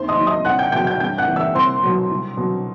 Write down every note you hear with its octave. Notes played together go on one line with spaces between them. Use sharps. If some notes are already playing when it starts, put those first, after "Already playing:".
Already playing: D#2 C5 C6
D#5 D#6
D#3 F#3
D#5 D#6
C2 F#5 F#6
G5 G6
B2 F#3 G5 G6
G5 G6
G2 G5 G6
F#5 F#6
E3
E5 E6
C2 C5 C6
B2 F#3
C2
B2 F#3